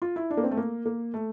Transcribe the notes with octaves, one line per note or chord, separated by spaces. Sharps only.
F4
E4
D4
A#3
C4
A3
A#3
A#3
A3